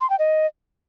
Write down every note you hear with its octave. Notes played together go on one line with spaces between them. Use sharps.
C6
G5
D#5